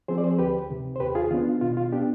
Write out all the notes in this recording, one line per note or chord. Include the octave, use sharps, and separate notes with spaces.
F3 C4 G#4 C5
D5
G#4 C5
D2 G4 B4
C3 D#3
C5
D#2 G4 B4
F4 G#4
D#3 B3 D4 F4
F4
B2 F4
F4
B3 D4 G4